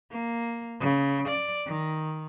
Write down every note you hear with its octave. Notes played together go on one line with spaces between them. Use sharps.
A#3
C#3
D5
D#3